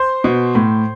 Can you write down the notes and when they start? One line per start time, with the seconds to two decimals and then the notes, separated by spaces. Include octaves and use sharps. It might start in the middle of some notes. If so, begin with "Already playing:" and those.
Already playing: C5 C6
0.24 B2
0.55 A2